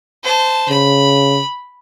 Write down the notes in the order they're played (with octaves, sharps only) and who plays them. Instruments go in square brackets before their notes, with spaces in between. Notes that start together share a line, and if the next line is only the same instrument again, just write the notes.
[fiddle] C5 A5
[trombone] C#3 [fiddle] B5